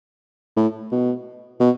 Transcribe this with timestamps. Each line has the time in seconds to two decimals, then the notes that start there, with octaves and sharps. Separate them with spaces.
0.56 A2
0.92 B2
1.60 B2